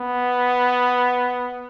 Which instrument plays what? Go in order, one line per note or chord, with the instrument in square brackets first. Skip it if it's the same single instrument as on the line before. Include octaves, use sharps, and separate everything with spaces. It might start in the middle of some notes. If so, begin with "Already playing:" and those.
Already playing: [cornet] B3